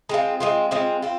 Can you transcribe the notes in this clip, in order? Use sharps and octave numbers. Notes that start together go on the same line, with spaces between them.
G#3 C4 F4
G#3 C4 F4
G#3 C4 F4
C4 F4